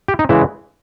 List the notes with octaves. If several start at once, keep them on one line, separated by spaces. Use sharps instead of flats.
G4
D#4
C#3 E3 G#3 E4